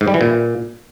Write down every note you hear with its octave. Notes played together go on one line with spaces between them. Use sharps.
G#2
G3
E3
A#2